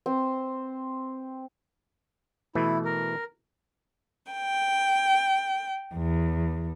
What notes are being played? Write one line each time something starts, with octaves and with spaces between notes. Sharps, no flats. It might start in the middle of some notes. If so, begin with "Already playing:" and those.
C4
B2 E3 A3 E4
A#4
G5
E2